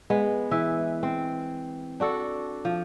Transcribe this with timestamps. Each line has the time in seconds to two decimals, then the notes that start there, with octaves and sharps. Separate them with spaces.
0.10 G#3 B3
0.51 E3 E5
1.03 C4
2.00 D4 F#4 A4 F#5
2.65 F3